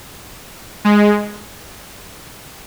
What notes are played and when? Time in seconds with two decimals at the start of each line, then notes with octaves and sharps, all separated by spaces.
0.85 G#3